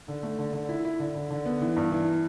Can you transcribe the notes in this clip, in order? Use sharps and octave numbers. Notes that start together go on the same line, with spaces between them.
D3
A3
D3
D3
E4
E4
D3
D3
D3
B3
E3
G2
E3